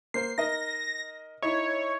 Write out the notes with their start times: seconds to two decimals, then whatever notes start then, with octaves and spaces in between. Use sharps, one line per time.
0.14 A#3 C5 C7
0.38 D#4 A#4 D#5 A#6
1.42 D#4 E4 C#5 E5